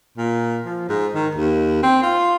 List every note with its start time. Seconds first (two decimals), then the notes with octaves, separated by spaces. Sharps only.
0.18 A#2
0.65 F3
0.89 G#2
1.14 D#3
1.35 D#2
1.83 C4
2.02 F4